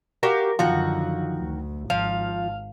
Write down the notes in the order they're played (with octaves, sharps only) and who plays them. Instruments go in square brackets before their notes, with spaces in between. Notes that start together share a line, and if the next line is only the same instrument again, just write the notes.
[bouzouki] F#4 G4 F5 [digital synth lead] A#4
[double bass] F#2 D3 [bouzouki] D#3 F#4 [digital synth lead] F3
[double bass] D2
[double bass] G#1 [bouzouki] F3 [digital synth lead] F5